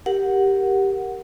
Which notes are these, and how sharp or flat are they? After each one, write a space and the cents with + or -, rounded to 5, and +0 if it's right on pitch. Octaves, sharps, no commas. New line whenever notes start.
G4 +0 A#4 +0 F#5 +0